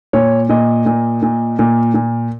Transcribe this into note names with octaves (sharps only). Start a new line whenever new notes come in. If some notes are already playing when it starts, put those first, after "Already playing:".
A#2 C#5
A#2 D#5
A#2
A#2
A#2
A#2